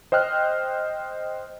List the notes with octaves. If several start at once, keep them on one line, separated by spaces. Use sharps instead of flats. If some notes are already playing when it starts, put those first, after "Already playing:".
C5 D#5 G5 F6 F#6